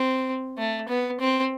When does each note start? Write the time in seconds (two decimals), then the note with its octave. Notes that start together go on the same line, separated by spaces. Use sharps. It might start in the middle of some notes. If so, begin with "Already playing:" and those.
Already playing: C4
0.58 A3
0.89 B3
1.20 C4